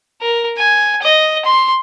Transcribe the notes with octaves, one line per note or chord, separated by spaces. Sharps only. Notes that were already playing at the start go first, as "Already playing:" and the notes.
A#4
G#5
D#5
C6